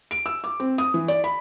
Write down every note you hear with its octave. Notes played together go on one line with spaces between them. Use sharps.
D7
E6
D6
C4
D#6
E3
D5
B5